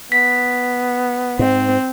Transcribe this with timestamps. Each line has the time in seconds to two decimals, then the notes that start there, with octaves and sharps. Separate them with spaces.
0.12 B3 B6
1.39 G#2 C4